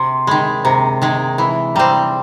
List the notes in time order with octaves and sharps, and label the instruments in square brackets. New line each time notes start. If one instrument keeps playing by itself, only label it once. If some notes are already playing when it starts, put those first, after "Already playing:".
Already playing: [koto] C3 [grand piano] C6
[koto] D#3 G#3 [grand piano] B5
[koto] C3 [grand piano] A#5
[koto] D#3 G#3
[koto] E3 [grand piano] B5
[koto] G3 C4 [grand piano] A#5